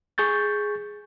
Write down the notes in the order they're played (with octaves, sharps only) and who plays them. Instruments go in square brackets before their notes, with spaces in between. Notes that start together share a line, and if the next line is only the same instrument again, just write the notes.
[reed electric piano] G#4 C#6 G6 A6